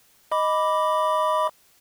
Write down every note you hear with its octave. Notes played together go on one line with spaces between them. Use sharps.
D#5 B5 D6